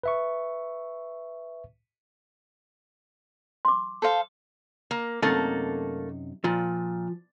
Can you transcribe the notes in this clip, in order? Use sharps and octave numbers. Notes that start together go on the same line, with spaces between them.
B4 E5 C#6
C6 D6
A4 C5 F5
A#3
F#2 C3 A3 A#3 D#4 A4
A#2 F3